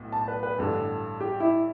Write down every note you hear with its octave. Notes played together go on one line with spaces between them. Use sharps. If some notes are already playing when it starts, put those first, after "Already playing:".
Already playing: B1 A2 B3
A5
B4
B4
A1 G2 D3 A4
G4
E4